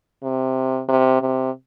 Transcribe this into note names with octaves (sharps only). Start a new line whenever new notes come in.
C3
C3
C3